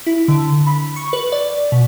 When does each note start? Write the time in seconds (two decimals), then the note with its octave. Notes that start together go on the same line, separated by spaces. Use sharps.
0.06 E4
0.28 D3
0.66 B5
0.96 C#6
1.13 B4
1.32 D5
1.72 B2